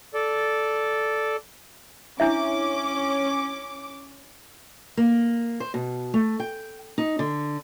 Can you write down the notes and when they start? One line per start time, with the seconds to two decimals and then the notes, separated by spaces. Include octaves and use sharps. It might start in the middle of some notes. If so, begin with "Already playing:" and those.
0.14 A4 D5
2.20 C#4 D4 E4 E5 D6
4.97 A#3
5.60 C5
5.74 B2
6.14 A3
6.40 G5
6.98 D#4
7.19 D3